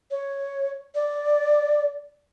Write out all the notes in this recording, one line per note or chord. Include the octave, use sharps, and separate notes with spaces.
C#5
D5